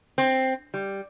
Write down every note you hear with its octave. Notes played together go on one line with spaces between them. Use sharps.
C4
G3